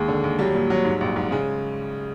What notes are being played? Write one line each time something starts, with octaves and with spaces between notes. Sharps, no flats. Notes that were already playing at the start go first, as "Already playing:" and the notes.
Already playing: D#2 G#3
D3
D#2
F#3 G3
A#2
F#3
G#2
A#1
G#2
C#3 G#3